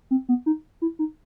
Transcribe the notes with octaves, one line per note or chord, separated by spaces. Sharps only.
C4
B3
D#4
E4
D#4